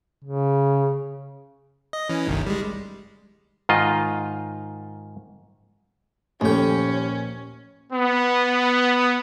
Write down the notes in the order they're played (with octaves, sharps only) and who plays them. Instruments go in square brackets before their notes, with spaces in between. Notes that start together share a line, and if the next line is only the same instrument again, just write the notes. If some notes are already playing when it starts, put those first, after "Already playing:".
[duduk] C#3
[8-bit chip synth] D#5
E3 C#4
G1 C2 D#3
G3 G#3
[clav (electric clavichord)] G#2 D#3 F4 D#5
[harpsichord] D#2 G5 [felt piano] A#2 F3 [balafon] A3 A4 [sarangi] C#4
[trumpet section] B3